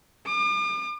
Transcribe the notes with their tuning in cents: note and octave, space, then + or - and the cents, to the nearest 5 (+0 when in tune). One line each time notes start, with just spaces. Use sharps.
D6 +45